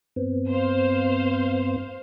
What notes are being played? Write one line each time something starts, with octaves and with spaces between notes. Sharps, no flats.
G2 B3 C4
C5 F5